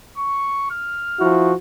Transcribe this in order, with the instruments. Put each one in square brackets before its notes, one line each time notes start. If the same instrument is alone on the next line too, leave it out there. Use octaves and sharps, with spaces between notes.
[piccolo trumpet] C#6
F6
[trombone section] F3 E4 F#4